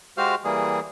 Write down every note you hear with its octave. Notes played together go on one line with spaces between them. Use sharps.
G#3 F#4 G4 C5 F5 F6
E3 G3 A#3 G#4